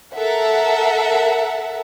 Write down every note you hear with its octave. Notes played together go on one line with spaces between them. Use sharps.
A4 A#4 E5 F#5